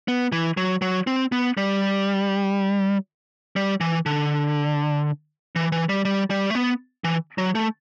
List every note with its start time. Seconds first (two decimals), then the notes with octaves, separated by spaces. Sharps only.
0.08 B3
0.32 E3
0.57 F#3
0.82 F#3
1.07 C4
1.32 B3
1.57 G3
3.56 G3
3.80 E3
4.06 D3
5.56 E3
5.72 E3
5.89 G3
6.05 G3
6.30 G3
6.50 A3
6.55 B3
7.04 E3
7.38 F#3
7.55 A3